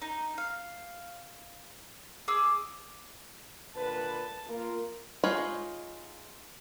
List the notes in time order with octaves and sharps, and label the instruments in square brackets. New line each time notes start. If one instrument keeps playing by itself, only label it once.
[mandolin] D#4
F5
G#4 D6 E6
[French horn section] A#2 D3 B4 [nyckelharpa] A5
[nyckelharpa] A#3 [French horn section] F4 A#4
[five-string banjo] G#3 D#4 F4 C#5 B5